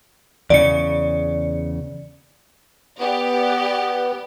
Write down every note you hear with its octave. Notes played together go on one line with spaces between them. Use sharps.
E2 A2 C#3 D5 C#7
B3 G4 D5